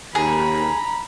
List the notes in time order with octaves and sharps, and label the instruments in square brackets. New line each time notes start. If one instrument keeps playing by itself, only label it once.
[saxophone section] D#2 [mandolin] G#4 [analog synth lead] A#5 [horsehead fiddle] B5